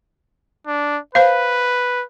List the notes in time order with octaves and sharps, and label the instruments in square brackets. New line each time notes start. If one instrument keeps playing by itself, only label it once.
[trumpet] D4
[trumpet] B4 [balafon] C5 F5